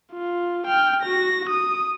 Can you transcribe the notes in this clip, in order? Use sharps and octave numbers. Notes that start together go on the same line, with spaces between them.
F4
G5 F6
F#4 A#6
D#6